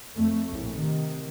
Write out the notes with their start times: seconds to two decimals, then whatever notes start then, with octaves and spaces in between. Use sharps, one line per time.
0.14 F2 A3
0.50 A#1 A2
0.79 C3 D#3